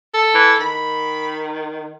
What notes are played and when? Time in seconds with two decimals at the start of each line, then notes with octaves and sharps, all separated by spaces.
0.14 A4
0.35 E3
0.61 D#3 B5